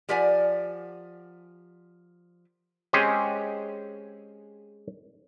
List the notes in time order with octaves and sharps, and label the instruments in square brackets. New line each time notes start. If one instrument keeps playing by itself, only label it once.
[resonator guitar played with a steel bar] F3 G4 A#4 D5 F#5 G#5
[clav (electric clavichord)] G#3 C4 C#4 G4 G#4 G5